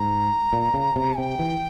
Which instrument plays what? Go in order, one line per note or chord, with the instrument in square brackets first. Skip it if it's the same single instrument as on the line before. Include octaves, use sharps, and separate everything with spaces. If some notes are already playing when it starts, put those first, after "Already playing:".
Already playing: [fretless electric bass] G#2 [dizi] A#5
[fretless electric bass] A#2
C#3
C3
[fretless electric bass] C3 [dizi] G5
[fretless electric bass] E3